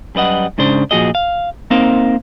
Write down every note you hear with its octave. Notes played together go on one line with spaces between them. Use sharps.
F#2 G3 B4 D#5 F#5
G#2 C#3 D4 C5
A#2 F3 F#4 G#4 D#5
F5
A#3 C4 D#4 A#4 C5 F5